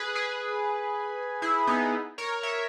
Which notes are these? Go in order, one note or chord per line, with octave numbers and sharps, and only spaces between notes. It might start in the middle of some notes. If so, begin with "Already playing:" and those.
Already playing: G#4 B4
G#4 B4
E4 G#4
B3 D#4
A#4 C#5
C#5 E5